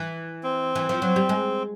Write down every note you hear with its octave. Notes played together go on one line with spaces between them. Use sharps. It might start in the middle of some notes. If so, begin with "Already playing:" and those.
Already playing: E3
C4
E3
F3
F#3
G3
G#3